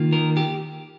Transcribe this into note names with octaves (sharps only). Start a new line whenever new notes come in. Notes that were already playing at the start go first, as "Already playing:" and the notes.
Already playing: D#3 A#3 F4
A#4
G4